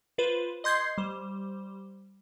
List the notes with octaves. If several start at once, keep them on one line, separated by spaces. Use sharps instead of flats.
F4 B4 C5
D#5 C6 G6 G#6 C7
G3 C5